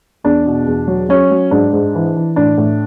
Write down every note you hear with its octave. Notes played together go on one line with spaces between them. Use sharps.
E2 D4
B2
E2
F#3
F#3 C#4
F#3
G#2 D4
G#2
E3
E3
A2 D4
A2